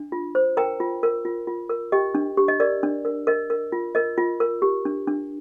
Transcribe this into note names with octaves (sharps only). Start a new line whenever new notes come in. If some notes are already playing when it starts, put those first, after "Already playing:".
Already playing: D4
F4
C5
A#4 G5 A#5
F4
A#4
F4
F4
A#4
G4 D#5 G5
D4
G4
D#5
A#4 D5
D4
A#4
A#4 D#5
A#4
F4
A#4 D#5
F4
A#4
G4
D4
D4